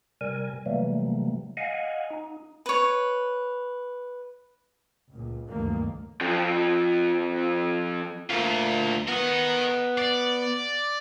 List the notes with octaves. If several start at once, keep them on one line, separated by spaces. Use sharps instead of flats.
C3 G3 A#4 G#5
C3 E3 F#3 G3 A3 A#3
D#5 F5 F#5 G#5
D#4
B4 C#5
C#2 A#2
F#1 D2 G2 D#3 A#3
F2 F3
D2 F4 A#4
B3 A#4 D#5
D5